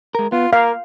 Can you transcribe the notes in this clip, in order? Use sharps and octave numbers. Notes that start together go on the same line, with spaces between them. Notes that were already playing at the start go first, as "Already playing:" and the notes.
G#3 A#4
B3 F4
A#3 A#4 F5